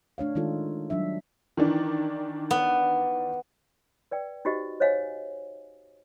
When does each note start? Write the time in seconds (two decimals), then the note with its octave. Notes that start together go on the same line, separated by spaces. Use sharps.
0.18 A3 D4 C#5 F5
0.35 D#3 G#3 D#4 F4 A4
0.90 F#3 G3 D4 D#4 E5
1.57 D#3 E3 D4
2.51 B3
4.11 B4 D5 G5
4.45 D#4 F#4 G4 C5 D#5
4.80 C5 C#5 D#5 F5 G#5